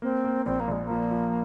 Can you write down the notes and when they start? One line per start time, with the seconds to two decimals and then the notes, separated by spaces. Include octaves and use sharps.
0.02 A#3 C4
0.24 A#3
0.46 A#1 C4
0.60 A#3
0.68 A#1 G#3
0.85 A#3
0.90 F3
1.11 F3